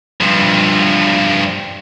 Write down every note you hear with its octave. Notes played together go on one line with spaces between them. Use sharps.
G2 F3